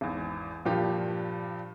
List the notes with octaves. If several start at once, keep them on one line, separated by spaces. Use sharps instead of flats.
G#1 E2
G2 A#2 F3 G4